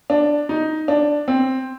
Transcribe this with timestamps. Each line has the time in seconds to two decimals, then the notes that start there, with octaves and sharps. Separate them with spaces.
0.10 D4
0.49 D#4
0.88 D4
1.28 C4